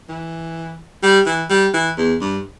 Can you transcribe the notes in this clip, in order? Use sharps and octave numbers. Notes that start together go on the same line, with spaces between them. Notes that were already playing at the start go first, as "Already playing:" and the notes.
E3
G3
E3
G3
E3
E2
G2